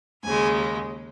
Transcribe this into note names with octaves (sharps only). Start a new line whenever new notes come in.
D#2 C#3 G#3 G#5